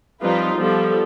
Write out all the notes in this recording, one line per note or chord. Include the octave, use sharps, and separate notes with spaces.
F3 G3 C4 D#4 F4 B4
F3 G3 B3 A4